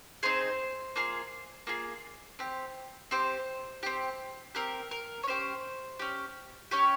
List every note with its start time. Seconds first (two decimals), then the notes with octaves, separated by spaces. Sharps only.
0.23 C4 D#4 G#4 C5
0.96 A#3 F4 G#4
1.67 A#3 F4 G#4
2.39 C4 G4
3.11 C4 G4 C5
3.83 C4 G4
4.55 C4 G4 A#4
4.91 A#4
5.23 C#5
5.27 C#4 G4 C5
5.99 C#4 G4
6.71 C#4 G4 C#5